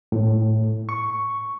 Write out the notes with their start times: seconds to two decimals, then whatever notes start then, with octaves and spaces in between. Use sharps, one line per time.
0.12 A2
0.89 C#6